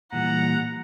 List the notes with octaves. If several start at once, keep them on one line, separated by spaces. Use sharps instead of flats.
A#2 E3 G3 F#5 A#5